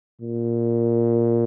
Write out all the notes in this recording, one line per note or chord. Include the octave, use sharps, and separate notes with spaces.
A#2